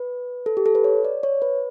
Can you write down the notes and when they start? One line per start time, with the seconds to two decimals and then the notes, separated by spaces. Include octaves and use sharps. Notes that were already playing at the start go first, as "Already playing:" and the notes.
Already playing: B4
0.46 A4
0.57 G4
0.66 A4
0.75 B4
0.84 C#5
1.05 D5
1.23 C#5
1.42 B4